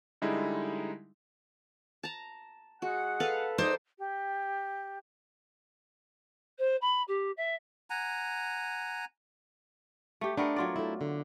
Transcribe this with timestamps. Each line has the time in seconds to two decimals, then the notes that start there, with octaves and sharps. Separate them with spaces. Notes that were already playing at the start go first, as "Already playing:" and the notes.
0.22 D3 G3 G#3 D#4 E4
2.03 A5 A#5
2.82 G#3 F#4 G#4 F#5
3.20 A4 B4 F5
3.58 D#4 C5 D5
3.99 G4
6.59 C5
6.81 B5
7.08 G4
7.37 E5
7.90 F#5 G#5 A#5
10.21 A3 G4
10.37 A3 B3 D4 A#4
10.56 F#3 F4 D5
10.76 A3 E4
11.01 D3